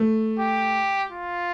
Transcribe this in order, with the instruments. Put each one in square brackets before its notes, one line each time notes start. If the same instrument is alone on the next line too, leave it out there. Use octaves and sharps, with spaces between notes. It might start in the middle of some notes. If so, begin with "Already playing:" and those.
Already playing: [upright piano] A3
[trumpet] G4
F4